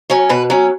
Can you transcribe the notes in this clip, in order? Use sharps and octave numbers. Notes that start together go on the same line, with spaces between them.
F#3 C#4 C#5
B2 B4
F#3 C#4